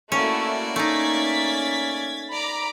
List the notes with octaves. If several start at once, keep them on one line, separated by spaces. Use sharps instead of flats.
A3 A#3 C#4 E4 F#4 D5
A3 C#4 D#4 G#6 A6 B6
D5 A#5 B5 D6